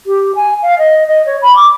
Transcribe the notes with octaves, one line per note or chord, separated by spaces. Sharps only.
G4
G#5
F5
D#5
D#5
C#5
B5
D6